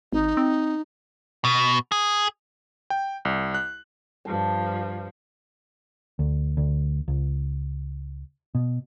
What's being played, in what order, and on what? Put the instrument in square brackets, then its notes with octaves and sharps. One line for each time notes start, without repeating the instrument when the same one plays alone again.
[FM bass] G#1 [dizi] D#4
[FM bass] C4
[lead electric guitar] B2
G#4
[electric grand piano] G5
C2
F#6
[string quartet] G2 F3 [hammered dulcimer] A5
[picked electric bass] D2
D2
C#2
B2